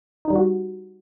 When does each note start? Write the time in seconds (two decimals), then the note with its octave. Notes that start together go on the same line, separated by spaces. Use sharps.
0.25 D#4
0.30 G3
0.36 F#4